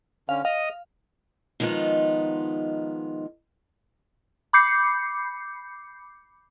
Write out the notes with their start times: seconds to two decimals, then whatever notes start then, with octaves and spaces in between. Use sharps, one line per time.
0.29 D3 C#4 F5
0.45 D#5 F5 D#6
1.60 D#3 F3 G#3 B3 D#4 F4
4.53 B5 D6 G6 C7 C#7